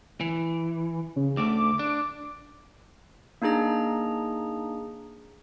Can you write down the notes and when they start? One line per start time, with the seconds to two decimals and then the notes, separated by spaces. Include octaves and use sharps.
0.21 E3
1.16 C#3
1.37 D2 A3 D6
1.79 D4
3.42 A#3 D4 D#4 G#4 A#5